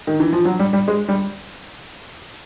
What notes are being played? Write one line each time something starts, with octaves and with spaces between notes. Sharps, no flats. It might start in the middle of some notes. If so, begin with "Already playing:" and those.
D#3
E3
F3
F#3
G3
G3
G#3
G3